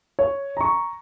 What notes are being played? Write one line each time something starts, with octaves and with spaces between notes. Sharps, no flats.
C#5
A#5 C#6